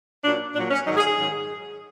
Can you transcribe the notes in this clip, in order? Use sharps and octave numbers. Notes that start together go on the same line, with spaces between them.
A#2 F#3 D4
A#2 F#3 D4
C#4
G#2 D#3 F#3 D#4
G#4
G#4
G#2 D#3 F#3